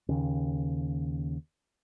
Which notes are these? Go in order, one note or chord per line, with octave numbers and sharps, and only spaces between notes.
D#2 C#3